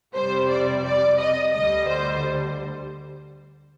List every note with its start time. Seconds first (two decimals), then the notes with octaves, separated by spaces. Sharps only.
0.15 F2 C3 G3 C5
0.50 D5
0.85 D5
1.20 D#5
1.54 D2 D3 G3 D#5
1.89 C5